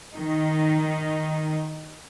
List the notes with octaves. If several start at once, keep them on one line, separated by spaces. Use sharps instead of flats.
D#3 D#4